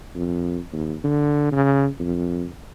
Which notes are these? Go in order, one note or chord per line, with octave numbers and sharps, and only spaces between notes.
F2
D#2
D3
C#3
F2